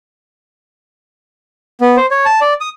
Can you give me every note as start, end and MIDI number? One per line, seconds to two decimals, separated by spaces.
1.81 1.96 59
1.97 2.06 72
2.11 2.25 73
2.25 2.40 81
2.41 2.54 74
2.61 2.69 87